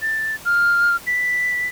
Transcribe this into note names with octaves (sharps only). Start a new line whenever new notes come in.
A6
F6
B6